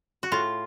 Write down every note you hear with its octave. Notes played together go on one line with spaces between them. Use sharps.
F#4
A2 F4